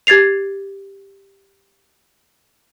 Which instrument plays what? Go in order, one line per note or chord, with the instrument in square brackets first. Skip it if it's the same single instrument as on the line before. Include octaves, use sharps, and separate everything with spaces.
[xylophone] G4 G#6 A6 C7 F7